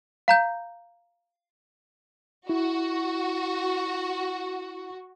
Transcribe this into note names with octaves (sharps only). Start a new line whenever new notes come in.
F5 A#5 G6
E4 F#4